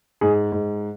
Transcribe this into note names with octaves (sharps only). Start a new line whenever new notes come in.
G#2 G#4
G#2